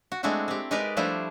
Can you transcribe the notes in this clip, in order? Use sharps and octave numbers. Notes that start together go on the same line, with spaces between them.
F#4
G#3 A3 C4 D4 E4 F#4
C4 G4
G#3 D#4 G4 A#4 B4 D5
F3 G3 A3 D4 E4 C5